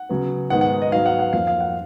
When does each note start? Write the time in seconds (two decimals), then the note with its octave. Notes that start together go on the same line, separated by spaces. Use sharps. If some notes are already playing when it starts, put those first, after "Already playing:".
Already playing: F#5
0.09 C#3 F#3 B3
0.50 G#2 D#3 G#3 B3 F#5
0.61 F#5
0.82 D#5
0.92 G#2 F#3 B3 F5
1.06 F#5
1.19 F#5
1.33 F2 F3 A#3 F5
1.47 F5
1.60 F#5